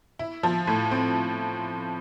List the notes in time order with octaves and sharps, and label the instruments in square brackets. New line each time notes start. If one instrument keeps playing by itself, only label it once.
[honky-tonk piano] E4
F3
A2
C4